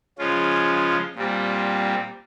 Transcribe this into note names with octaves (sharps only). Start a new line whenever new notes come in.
C#3 F3 G#3 C#4 F4
A#2 G3 C4